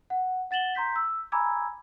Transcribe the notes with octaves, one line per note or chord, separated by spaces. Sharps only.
F#5
F#5 A6 E7 F#7 G7
A#5 C6 G6 B6
E6
G#5 A#5 B5 D6 E6 G#6